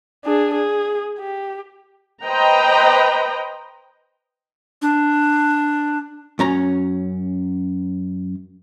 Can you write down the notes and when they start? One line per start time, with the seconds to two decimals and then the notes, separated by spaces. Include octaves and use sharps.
0.25 D4 G#4
0.54 G#4
1.19 G4
2.23 B4 C5 D#5 G5 A#5
4.82 D4
6.39 F#2 C#4 A#5